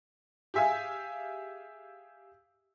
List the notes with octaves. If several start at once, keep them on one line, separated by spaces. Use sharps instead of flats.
G4 G#4 E5 F5 G#5